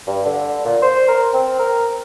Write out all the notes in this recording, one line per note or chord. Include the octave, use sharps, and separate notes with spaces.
G2
D3
A#2
C5
A#4
C4
A#4